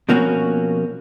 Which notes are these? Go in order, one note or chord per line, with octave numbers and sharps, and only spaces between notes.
B2 F3 A#3 C4 C#4 F#4